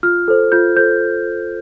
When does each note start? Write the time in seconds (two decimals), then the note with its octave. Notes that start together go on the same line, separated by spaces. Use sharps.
0.03 F4 F6
0.28 A4 C5
0.52 F4 G6
0.77 A4 C5 G6